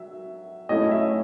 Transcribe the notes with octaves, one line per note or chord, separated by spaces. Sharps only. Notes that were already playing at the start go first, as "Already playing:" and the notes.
Already playing: F#3 E5
F#3 A3 C#4 E4 D#5
E5